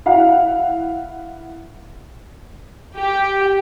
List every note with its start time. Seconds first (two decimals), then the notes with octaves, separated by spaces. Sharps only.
0.06 E4 F5 F#5
2.97 G4